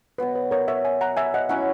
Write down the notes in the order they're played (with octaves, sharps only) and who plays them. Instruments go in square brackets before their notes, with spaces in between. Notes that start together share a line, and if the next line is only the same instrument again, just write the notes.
[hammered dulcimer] B2 F#3 B3 [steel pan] B4
[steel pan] B4
A#4 C#5
C#5 E5
E5 G#5
F#5 A#5
E5 G#5
D#5 F#5
[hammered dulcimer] F#3 C#4 E4 [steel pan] F#5 A#5